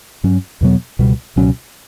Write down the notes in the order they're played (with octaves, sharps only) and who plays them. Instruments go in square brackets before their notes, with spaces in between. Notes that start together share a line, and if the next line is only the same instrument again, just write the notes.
[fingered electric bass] G2 F#3 C#4
E2 B2 F#3 B3
C#2 B2 G3
C#2 B2 F#3 C#4